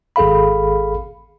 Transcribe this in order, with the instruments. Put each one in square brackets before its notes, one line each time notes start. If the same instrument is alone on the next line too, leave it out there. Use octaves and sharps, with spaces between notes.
[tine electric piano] G#1 G#4 A4 F5 B5